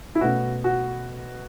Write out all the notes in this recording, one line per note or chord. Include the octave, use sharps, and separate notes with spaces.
E4
B2 A3 C#4 F#4
F#4